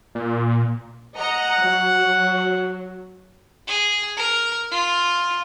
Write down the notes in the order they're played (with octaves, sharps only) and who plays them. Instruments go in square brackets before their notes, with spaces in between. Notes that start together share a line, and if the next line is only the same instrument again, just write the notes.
[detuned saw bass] A#2
[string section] D#5 A#5 C#7 [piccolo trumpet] F#5
[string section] F#3
[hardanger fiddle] G#4
A#4
F4